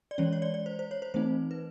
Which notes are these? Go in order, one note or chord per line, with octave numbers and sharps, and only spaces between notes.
D5
E3 G#3 C#4 C#5
C#5
D5
D5
C5
C5
C#5
C5
E3 A3 C4 D#4 C5
B4